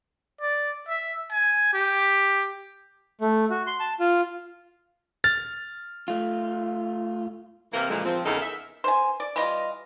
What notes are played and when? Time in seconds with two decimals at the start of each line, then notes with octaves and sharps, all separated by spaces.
0.42 D5
0.88 E5
1.32 G#5
1.73 G4
3.21 A3
3.50 F#4
3.67 C6
3.80 A5
4.00 F4
5.24 F6 A6
6.08 A3 F4
7.73 C3 E3 A#3 A#4
7.90 A#2 D3 E3 F3 G#3 F4
8.05 F3 C4
8.25 E2 C#3 D#4 A4 A#4
8.42 E5
8.84 C5 G#5
9.20 D5
9.36 E3 G3 F4 D#5